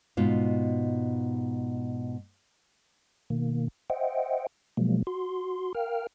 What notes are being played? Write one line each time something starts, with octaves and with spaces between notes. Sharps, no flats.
G#2 B2 F4
B2 D#3 A#3
C5 D#5 E5 F#5 G5
B2 F3 F#3 G#3 A#3
F#4 C6
A#4 F5 G5 F6